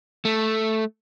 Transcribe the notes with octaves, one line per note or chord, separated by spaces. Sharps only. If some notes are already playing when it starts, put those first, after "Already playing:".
A3